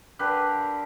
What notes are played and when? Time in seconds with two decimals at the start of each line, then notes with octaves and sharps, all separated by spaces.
0.19 D3 G4 A#4 B4